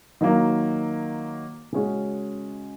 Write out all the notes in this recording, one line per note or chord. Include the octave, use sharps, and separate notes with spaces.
D#3 F#3 A#3
C#3 G#3 C#4 F#4